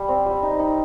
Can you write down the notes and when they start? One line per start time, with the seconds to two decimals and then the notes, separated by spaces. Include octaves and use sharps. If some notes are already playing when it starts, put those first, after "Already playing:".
Already playing: G3
0.08 C4
0.26 G3
0.43 D#4
0.59 D#4